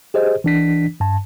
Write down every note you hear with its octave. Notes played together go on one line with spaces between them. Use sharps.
G4 G#4 C5 D#5
E3 D4 B6
G2 A5